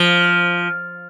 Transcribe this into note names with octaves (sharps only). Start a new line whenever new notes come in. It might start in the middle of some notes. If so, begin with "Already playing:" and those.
Already playing: F3